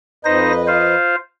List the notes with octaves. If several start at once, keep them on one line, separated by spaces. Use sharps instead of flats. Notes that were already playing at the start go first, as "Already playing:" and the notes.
F2 D#4 B4 C5 D#5 A#6
F4 C5 F5